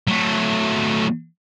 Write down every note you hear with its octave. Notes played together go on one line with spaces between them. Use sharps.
F#3 A3